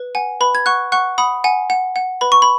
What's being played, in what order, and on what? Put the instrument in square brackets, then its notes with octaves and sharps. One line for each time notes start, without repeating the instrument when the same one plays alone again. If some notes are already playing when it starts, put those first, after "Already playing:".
Already playing: [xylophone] B4
F#5 G#5
B4 B5
G#6
F#5 C#6 F#6
F#5 C#6 F#6
F#5 B5 D#6
F#5 G#5
F#5
F#5
B4 B5
C#6
B5